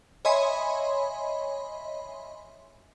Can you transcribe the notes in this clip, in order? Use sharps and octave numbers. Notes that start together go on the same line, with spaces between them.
C#5 D#5 E5 G#5 B5 C6